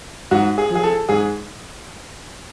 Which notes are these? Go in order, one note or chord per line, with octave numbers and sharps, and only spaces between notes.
G#2 F#4
G#4
F3
G#4
A4
G#2 G#4